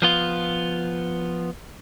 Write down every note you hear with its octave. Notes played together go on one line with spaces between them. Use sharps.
F3 B3 F4